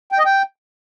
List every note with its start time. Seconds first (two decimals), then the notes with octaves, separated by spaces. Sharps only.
0.12 G5
0.19 D#5
0.25 G5